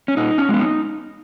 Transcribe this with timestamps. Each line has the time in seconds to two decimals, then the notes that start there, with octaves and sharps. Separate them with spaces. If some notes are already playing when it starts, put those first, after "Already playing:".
0.08 C#4
0.17 A#2 D#4
0.38 C#4
0.49 G#3 B3
0.60 D#4